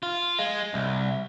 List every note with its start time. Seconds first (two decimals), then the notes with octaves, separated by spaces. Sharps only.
0.03 F4
0.38 G#3
0.74 C2